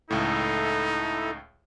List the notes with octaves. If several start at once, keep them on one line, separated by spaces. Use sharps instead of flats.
C#2 A2 D#4 E4 A4